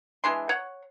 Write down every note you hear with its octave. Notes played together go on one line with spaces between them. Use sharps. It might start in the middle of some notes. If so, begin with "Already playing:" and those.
E3 G#3 D4 C6
C#5 F#5